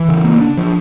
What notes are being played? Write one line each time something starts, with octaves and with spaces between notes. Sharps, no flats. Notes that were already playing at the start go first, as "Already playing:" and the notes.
Already playing: E3
C#3
A#3
D4
F3